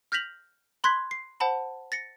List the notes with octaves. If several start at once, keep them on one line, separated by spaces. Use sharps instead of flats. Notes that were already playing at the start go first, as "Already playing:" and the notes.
F6 G6 A#6 B6 F7 F#7
B5 C6 F#6 G#6 B6
C7
C5 F#5 A5 B5
A6 A#6 C#7